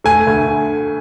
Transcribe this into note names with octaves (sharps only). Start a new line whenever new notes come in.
A3 G#5
D2